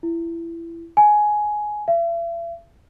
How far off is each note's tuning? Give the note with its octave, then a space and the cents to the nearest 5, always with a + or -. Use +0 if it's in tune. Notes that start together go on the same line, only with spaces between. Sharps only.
E4 +25
G#5 +15
E5 +45